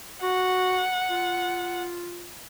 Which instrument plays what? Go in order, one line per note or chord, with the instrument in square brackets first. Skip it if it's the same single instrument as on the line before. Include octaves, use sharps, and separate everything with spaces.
[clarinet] F#4 [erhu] F#5
[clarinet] F4